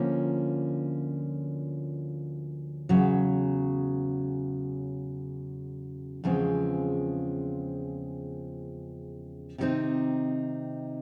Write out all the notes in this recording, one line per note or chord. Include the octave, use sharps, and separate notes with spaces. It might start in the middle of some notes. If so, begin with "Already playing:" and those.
Already playing: D2 D3 F3 A#3 C#4
E2 C#3 F#3
E2 C#3 F3 G#3 C4
C3 D#3 G3 C4 D#4